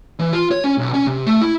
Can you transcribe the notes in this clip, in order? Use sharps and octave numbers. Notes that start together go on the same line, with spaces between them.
E3
F4
C#5
C#4
B1
C#4
C3
A3
E4